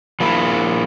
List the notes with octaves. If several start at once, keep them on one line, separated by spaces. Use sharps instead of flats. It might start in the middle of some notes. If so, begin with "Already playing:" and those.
F3 A#3 E4